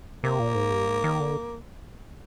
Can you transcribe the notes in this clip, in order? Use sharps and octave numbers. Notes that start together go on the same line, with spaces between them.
C3 A#3
A#2
G#2
G2
G#2
D#3
D3